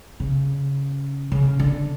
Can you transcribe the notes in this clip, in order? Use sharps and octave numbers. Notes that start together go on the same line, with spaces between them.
C#3
C#3
D3